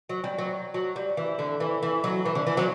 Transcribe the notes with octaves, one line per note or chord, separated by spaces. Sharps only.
F#3
G3
F#3
F#3
G3
E3
D3
E3
E3
F#3
E3
D3
E3
F#3